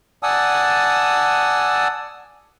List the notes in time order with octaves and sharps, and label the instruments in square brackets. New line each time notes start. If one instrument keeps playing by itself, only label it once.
[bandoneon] D5 F#5 G#5 A5 D#6 E6